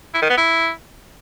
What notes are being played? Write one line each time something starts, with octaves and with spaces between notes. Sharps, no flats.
E4
D#3
B3
E4